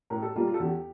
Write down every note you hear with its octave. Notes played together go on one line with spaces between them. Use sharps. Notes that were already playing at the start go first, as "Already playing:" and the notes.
A2 A#4
A4
G3 A#3 F4
F4
A4
E2 G4